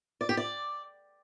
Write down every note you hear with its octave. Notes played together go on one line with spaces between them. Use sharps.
D5
G4
D5